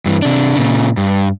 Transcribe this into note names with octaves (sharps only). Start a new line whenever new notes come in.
G2 E3
C3 D4
A#2 C#3
G2